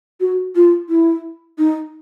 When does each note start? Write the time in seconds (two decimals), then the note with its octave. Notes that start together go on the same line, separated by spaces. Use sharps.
0.21 F#4
0.56 F4
0.89 E4
1.58 D#4